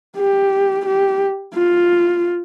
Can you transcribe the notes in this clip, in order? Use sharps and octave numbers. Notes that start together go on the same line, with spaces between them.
G4
G4
F4